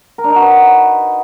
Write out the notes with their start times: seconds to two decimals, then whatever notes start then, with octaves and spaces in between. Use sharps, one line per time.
0.18 A#4
0.24 D4
0.30 D#4
0.36 F#4
0.41 B4